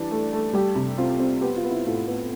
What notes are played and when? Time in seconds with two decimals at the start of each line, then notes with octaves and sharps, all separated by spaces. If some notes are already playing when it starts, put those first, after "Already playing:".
Already playing: E3 G3 D4
0.11 A3
0.33 A3
0.53 G3 G4
0.75 C3
0.98 C4 F4
1.19 C4
1.41 B3 G4
1.56 F4
1.64 B3
1.71 E4
1.86 A2 F4
2.07 B3